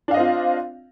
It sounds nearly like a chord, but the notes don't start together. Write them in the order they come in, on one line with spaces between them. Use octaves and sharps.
D4 F5 D#5 C4 F4